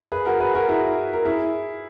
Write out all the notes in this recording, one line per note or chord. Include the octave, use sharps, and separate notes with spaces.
G#4 B4
F#4 A#4
G#4 B4
F#4 A#4
E4 G#4
A#4
E4 G#4